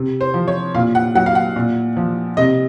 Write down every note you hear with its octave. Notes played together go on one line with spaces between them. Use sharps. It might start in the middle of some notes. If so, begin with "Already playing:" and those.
Already playing: C3
C5
F3
C#5
A#2 F5
F#5
F#3 F#5
F5
F#5
A#2
F3
C3 D#5